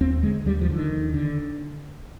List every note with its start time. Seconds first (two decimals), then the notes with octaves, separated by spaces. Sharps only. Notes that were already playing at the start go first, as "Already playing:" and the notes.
0.01 D#2 C4
0.23 D3 G#3
0.45 D#2 G3
0.61 F3
0.69 D3
0.76 D#3
0.92 D#2
1.14 D3